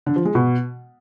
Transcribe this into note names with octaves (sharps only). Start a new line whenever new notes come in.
D3
F3
G#3
B2